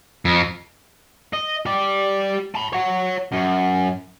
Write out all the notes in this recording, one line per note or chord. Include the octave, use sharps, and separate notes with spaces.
F2
D#5
G4 D5
A5 B5
C#5 F#5
F#2